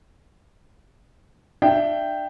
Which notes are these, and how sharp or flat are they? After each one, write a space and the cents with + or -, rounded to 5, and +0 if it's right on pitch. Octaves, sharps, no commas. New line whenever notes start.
D4 +35 E5 +30 G5 +0